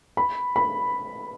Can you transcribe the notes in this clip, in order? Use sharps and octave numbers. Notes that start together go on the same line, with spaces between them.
B5
B5